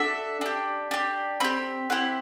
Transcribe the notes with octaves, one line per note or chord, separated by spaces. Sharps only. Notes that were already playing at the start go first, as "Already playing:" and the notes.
Already playing: D4 F#4 A4 E5
D4 G4
D4 G4
C4 G4 B5
C4 E4 G4 F#5